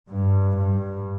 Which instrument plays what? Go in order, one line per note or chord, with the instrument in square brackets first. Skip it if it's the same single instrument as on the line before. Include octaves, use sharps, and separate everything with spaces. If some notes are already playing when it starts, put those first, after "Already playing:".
[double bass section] G2
G2